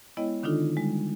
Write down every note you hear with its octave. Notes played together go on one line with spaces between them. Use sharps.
G#3 B3 E4 C#5 D#5 G5
D3 D#3 D4 D#4 F4 A4
G3 G#3